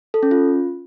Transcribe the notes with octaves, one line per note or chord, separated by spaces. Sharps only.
A4
C#4
F4